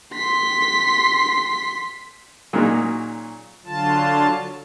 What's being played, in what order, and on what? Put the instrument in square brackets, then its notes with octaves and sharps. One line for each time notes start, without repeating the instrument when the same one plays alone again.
[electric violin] C6 B6
[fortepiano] A#2 F#3 C#4 D#4 G#4 A#4
[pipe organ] D3 F#3 F4 A5